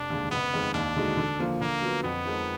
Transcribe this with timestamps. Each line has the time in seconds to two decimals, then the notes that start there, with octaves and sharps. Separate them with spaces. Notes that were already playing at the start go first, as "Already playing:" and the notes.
Already playing: F1 D4
0.10 D#2 D3 G#3
0.31 F#1 B3
0.53 F2 D#3 G#3
0.74 D#2 D4
0.96 D3 G#3 D#4 F#4
1.17 D3
1.39 F3 A#3 F4
1.60 D3 A#3
1.82 F#3 B3 F4
2.03 F2 B3
2.25 F3 G#3 D#4 A#4